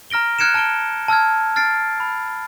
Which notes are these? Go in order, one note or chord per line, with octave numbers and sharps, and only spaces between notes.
A#5 F6 A#6 D7 G7
F6 F#6 G#6 C#7 D7 E7
A5 F6 F#6 D7 G7
A5 E6 F6 G#6
F6 A6 C7 D7
B5